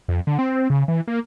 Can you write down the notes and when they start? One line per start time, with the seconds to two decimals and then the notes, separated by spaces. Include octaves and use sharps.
0.08 F2
0.27 D3
0.39 C4
0.70 C#3
0.88 E3
1.07 A#3